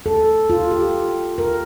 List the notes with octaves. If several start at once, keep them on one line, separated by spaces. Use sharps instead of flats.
A4
F4
G4
A#4